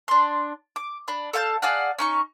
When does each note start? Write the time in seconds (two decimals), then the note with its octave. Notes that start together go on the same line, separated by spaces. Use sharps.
0.08 D4 C6
0.76 D6
1.08 D4 B5
1.33 A4 F5 A5 G6
1.62 G#4 D5 F5 F#5
1.99 C#4 D#4 C#6